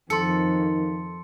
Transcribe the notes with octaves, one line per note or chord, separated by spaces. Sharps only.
F2 D#3 A4 C6 C#7